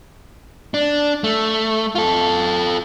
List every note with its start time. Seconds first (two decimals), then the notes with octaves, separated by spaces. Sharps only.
0.74 D4
1.24 A3
1.95 F4 A4